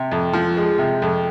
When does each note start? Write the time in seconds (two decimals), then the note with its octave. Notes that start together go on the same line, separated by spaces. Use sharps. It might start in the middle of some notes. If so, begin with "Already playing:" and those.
Already playing: C3
0.11 F2
0.33 F3
0.57 G#3
0.78 C3
1.02 F2